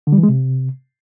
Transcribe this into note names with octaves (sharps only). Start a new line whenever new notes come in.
D3
G3
E3
G#3
C3